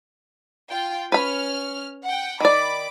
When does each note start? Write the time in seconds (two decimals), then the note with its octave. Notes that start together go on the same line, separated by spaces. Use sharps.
0.69 F4 G5
1.12 C#4 B4 B5 F6
2.04 F#5 G5
2.40 D#3 D5 B5 D6